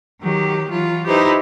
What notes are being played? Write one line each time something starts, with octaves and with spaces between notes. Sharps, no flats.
D#3 F#3 G4
E3 F#3 F4
D#4 E4 G4 B4 C5